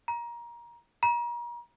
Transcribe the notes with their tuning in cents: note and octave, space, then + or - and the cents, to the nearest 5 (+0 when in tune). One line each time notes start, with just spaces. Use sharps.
A#5 +20
A#5 +35